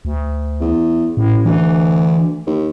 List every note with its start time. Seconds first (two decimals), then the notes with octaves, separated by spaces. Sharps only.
0.05 D2
0.61 E2
1.17 A1 A2
1.45 D2 E3
2.46 D#2